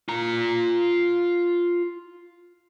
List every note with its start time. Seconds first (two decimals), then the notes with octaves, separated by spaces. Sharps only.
0.09 F4 A#5